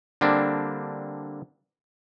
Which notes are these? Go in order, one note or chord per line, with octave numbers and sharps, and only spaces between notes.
D3 G3 A#3 C4 D4